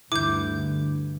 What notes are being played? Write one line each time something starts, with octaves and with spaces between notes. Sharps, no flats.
D2 G2 D3 E3 D6 G6